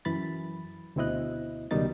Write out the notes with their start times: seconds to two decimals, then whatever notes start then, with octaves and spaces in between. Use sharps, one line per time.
0.05 F#2 E3 B5 A6
0.96 D2 B2 C4 E4 D#5 F#6
1.71 C#2 B2 D#3 G3 D#4 A6